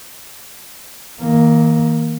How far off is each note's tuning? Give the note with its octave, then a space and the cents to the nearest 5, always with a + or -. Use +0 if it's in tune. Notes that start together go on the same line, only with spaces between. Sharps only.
D#3 +45 A#3 +0